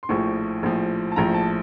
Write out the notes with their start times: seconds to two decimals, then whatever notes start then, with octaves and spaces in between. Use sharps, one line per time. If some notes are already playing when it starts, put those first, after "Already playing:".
0.03 C6
0.09 A#1 A2 F3 C#6
0.63 A#1 A2 F3
1.12 A5
1.16 A#1 A2 F3 A#5
1.34 A5